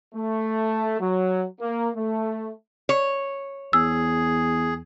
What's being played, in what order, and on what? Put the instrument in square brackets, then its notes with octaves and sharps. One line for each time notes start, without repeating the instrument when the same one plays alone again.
[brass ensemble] A3
F#3
A#3
A3
[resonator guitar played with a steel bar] C#5
[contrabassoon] E2 [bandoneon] G#4 [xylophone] E6